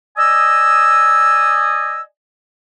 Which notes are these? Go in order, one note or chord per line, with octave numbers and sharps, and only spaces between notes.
D5 D#5 G#5 D#6 E6